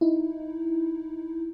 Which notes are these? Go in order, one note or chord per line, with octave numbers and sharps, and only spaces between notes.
D#4 E4